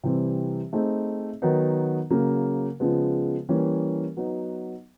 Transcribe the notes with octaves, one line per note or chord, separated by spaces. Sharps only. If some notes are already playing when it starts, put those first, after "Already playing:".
C3 E3 G3 C4
A3 C4 D#4 G#4
D#3 F#3 B3 D#4
C#3 F#3 A#3
C#3 F3 G#3 B3
E3 G3 A#3 C#4
F#3 B3 D#4